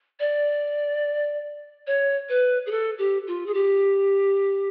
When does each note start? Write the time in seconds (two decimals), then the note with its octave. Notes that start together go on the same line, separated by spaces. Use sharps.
0.19 D5
1.87 C#5
2.29 B4
2.66 G#4
2.71 A4
2.98 G4
3.27 F4
3.46 G#4
3.54 G4